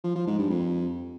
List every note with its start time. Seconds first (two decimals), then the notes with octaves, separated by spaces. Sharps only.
0.04 F3
0.16 F3
0.27 G#2
0.39 G2
0.50 F2